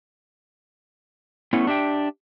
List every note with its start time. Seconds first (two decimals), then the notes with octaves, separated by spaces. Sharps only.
1.53 A3 B3 C#4 E4
1.67 D4 G4 E5 G5